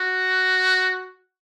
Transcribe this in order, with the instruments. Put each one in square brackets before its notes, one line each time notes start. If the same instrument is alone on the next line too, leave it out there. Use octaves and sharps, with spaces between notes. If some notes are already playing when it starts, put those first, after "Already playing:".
Already playing: [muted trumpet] F#4